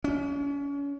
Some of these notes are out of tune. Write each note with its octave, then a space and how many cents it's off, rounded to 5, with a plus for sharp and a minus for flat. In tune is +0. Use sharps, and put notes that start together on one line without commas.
C#4 +35